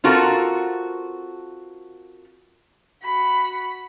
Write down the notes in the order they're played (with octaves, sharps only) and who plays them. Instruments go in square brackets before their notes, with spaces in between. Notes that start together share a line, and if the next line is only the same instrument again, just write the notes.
[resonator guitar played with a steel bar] C4 F4 F#4 A4 A#4
[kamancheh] F#4 B5